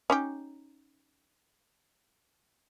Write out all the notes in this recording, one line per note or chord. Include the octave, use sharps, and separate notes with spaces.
C#4 D#4 G4